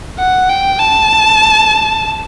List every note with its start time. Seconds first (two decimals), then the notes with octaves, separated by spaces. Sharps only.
0.19 F#5
0.49 G5
0.79 A5